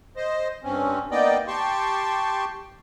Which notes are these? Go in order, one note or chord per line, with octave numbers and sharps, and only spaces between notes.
C5 D#5
G2 C4 C#4
A#3 B3 D#4 D5 D#5 G5
G4 G5 A5 C6 C#6